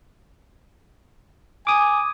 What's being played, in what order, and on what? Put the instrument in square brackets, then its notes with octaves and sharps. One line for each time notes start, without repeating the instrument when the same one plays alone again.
[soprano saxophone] G#5 [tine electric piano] D6 D#6